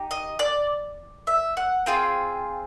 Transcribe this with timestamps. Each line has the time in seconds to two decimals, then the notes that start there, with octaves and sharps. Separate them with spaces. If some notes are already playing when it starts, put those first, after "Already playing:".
Already playing: D#4 G4
0.11 D#5
0.39 D5
1.27 E5
1.57 F#5
1.86 C4 F4 G#4 G5